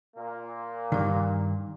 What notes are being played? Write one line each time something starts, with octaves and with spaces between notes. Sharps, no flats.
A#2 A#3
G2 D#3